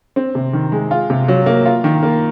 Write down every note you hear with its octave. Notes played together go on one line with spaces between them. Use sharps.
C4
C3
D#3
G#3
F4
C3
F#3
A#3
F4
D#3
A#3